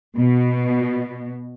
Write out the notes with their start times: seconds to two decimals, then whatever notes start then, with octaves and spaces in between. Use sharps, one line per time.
0.16 B2